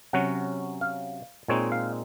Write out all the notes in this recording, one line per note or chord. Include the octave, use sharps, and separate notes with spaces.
C3 F#3 C#4 F#5
F5
A#2 G#3 C4 D#4 C#5
F5